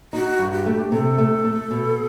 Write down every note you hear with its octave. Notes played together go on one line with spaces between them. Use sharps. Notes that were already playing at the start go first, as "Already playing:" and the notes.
D#4 F#4
G2
G4
A3
C3 A4
A3
A3
B2